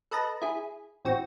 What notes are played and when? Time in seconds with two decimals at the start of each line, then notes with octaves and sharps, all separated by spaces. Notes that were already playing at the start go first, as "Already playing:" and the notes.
0.11 A4 B4 D#5 A5 A#5
0.42 E4 G#4
1.05 A1 C4 F#4 A#6